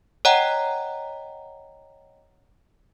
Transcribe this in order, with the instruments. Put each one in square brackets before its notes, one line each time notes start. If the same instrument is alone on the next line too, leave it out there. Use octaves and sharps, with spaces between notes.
[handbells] C#5 D#5 F#5 G5 A#5